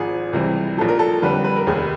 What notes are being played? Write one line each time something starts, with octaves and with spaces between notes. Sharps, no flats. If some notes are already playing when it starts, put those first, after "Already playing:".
Already playing: G#1 G#2 F3 G#4
C#2 C3 E3 G3
A#1 A#2 F#3 A4
A#4
A4
F2 D3 G3 B4
B4
B4
A#4
F1 D#2 D#3 G#4